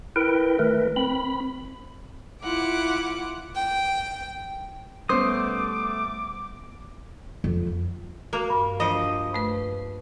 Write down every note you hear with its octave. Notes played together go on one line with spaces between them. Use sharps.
E4 A#4 B4 G5
D#3 A3 A#4 B4
C4 B5
E4 F4 F#5 D6
G5
G3 A3 B3 C#4 C5 D6 D#6
F2
A#3 F#4 F5
G2
G2 F3 D4 D#5
G2 A3 B4